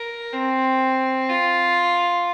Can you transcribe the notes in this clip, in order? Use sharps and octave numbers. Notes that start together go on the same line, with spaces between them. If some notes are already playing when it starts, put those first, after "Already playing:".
Already playing: A#4
C4
F4